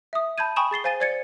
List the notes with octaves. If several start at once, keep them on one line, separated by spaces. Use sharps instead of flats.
E5 D#6
A5 B5 G6 G#6 D#7
G5 G#5 B5 C#6 D#6 E7
G#4 A6 C7 G7
C5 F5 G#5 A6 D#7
C5 D5 G#6 A6 C#7